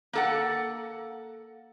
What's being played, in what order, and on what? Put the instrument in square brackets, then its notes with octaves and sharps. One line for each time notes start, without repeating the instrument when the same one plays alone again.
[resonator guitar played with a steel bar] A#3 A4 F#5